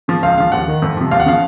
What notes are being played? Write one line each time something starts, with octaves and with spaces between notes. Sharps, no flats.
C#3 F3
C#2 F5
C#3 F3 F5
D#2 F#5
D#3
F2
C3 F3
D#2 F5
F#5
C#3 F3 F5